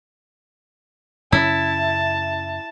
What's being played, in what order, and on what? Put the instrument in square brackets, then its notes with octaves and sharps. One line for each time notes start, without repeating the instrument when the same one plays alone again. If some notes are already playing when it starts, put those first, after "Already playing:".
[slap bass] F#2 C#3 C#4 [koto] E4 [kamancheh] A5